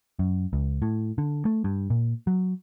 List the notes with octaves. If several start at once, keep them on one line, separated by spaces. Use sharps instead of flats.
F#2
C#2
A2
D3
A3
G2
A#2
F#3